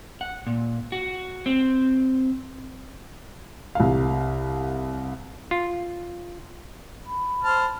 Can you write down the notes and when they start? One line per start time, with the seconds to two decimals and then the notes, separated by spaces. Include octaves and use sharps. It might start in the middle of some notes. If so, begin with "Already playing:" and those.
0.21 F#5
0.47 A#2
0.92 F#4
1.46 C4
3.75 C2 F5
5.51 F4
7.06 B5
7.44 C5 A5 F6